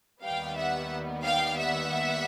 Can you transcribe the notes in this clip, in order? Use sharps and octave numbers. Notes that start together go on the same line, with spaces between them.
D#2 D#3 G3 B3 F5 G5
E5 F#5
F5 G5
E5 F#5